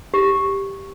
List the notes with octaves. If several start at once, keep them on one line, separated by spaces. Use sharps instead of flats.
G4